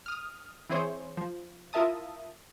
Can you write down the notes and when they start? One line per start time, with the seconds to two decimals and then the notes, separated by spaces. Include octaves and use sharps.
0.06 D#6 F6
0.70 E3 C4 E4 G#4 C5 C#5
1.17 F3
1.73 E4 F4 A#4 E5 A5 D#6